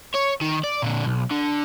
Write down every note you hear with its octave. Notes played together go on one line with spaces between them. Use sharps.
C#5
D#3
D5
A#2 D3
B1
D3